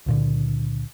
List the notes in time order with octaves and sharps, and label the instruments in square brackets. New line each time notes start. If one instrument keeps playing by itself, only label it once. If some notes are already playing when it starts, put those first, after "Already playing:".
[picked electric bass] C#2 A#2 D3